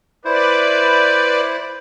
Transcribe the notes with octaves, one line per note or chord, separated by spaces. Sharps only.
E4 B4 C5 D5